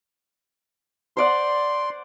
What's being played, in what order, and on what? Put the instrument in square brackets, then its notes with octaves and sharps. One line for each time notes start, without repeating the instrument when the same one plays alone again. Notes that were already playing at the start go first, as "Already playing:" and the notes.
[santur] C5 D5 F#5 [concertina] C6